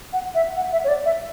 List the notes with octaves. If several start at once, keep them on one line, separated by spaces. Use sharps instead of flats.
F#5
E5
F#5
E5
C#5
D5
E5